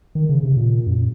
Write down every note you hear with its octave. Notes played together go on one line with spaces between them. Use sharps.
D#3
C#3
C3
A#2
F#2